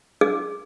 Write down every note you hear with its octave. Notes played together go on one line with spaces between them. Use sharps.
G#4